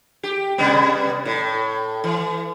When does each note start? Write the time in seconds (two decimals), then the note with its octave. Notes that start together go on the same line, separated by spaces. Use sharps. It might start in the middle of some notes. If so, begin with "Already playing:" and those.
0.23 G4
0.58 C3 G3 B3
1.25 A2
2.04 E3